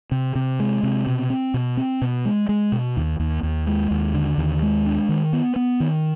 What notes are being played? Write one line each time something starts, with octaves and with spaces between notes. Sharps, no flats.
C3
C3
G#3
C3
B2
C4
B2
C4
B2
G#3
G#3
B2
D#2
D#2
D#2
G#3
D#2
D3
D#2
G#3
D4
D#3
B3
B3
D#3